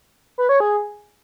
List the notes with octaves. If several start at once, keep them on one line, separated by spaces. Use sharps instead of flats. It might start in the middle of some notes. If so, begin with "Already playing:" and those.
B4
C#5
G#4